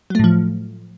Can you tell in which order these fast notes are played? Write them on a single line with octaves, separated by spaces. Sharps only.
F#3 A3 A2 F3